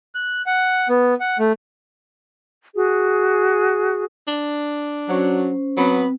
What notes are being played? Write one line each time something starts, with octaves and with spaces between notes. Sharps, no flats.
F#6
F#5
B3
F#5
A3
F#4 G#4
D4
F#3 C#4 C5
F#3 B3 C4 B4